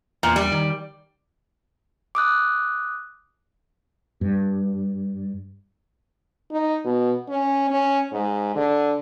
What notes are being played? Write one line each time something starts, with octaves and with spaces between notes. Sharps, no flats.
E2 A#2
G3
D#3
D6 D#6 F#6
G2
D#4
B2
C#4
C#4
G#2
D3